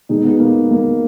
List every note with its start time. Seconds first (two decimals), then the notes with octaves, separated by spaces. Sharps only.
0.09 B2 G#3 D#4
0.25 B3
0.40 A#3
0.71 A#3